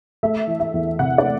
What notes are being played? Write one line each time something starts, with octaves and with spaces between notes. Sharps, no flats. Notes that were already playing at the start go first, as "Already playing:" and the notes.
A3 E5
E3
E5
E2
C3 F#5
D5
A3